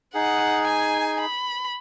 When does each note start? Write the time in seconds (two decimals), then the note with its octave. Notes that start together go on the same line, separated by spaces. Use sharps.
0.14 D#4 G#4 F#5
0.67 G#5
1.20 B5